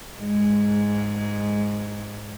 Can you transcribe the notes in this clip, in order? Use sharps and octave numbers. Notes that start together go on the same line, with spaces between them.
G#2 G#3